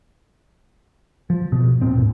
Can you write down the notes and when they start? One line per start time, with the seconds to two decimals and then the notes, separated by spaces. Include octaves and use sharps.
1.30 F3
1.52 B2
1.81 D#1 A#2 C4
1.98 G#2